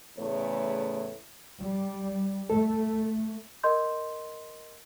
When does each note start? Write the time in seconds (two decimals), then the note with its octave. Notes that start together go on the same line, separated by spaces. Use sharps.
0.18 E2 A2 C#3 A3 C#5
1.61 G3
2.50 A3 A4
3.64 A#4 D#5 C6 G6